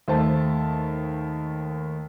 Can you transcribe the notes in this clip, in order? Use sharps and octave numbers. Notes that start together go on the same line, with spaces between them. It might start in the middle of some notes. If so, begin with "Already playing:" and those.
D#2 A3 C5 A5